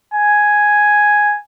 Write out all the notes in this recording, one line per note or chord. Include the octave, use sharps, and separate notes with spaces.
G#5